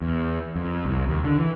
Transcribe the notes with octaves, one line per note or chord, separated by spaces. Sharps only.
E2
F2
C2
D#2
D3
E3